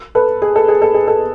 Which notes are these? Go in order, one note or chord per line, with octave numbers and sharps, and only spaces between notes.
A4 B4
G#4
A4
G#4
A4
G#4
A4